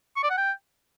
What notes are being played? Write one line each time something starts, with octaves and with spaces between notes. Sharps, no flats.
C#6
D5
F#5
G5